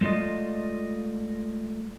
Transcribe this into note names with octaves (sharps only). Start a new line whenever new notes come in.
G#3 A3 F4 D5 D#5